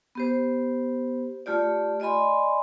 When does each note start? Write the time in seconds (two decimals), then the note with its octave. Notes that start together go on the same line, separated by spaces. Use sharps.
0.15 B3 G4 C5
1.46 A3 F4 G4 D5
2.00 D5 D#5 G#5 B5 C6